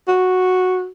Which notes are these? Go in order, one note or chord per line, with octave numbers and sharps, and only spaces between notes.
F#4